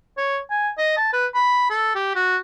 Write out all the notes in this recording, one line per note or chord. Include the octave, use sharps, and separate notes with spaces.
C#5
G#5
D#5
A5
B4
B5
A4
G4
F#4